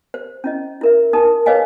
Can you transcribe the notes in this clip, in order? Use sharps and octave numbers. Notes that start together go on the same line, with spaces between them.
C5
C#4 E4 D#5
E4 A#4 E5
D#4 A#4 A5 D#6
G#4 B4 C#5 D#5 F5 G#5